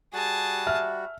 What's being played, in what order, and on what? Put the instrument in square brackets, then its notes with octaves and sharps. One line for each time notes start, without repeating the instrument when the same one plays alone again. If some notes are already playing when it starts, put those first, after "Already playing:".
[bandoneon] G3 F#4 [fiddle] G#4 A5
[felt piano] E5 F6